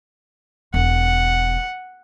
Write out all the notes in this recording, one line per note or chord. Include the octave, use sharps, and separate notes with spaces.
E1 F#5